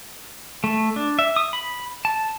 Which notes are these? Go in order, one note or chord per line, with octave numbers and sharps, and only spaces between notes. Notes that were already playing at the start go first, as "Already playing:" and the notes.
A3
D4
E5
D#6
B5
A5